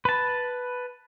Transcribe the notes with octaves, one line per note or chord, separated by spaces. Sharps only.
B4 A5